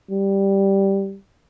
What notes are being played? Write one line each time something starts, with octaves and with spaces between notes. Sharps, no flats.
G3